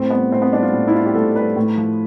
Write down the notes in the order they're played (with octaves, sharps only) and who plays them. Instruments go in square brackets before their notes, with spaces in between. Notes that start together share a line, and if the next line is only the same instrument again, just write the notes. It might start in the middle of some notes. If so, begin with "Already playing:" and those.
Already playing: [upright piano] A2 C4
G3 B3
A2 C4
B3
G3 D4
F4
A2
E4
G3 F4
G4
A2 A4
G3 B4
A2
F3